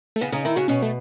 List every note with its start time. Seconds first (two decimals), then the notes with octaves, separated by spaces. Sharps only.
0.16 A3
0.21 C#3 B3
0.32 C#3 D#4
0.45 D#3 E4
0.56 C#3 F#4
0.68 B2 C#4
0.82 A3